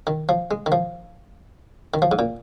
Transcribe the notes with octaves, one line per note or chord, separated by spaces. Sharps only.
D#3
F3
G#3
D#3
F3
D#3
F3
G#2
A#2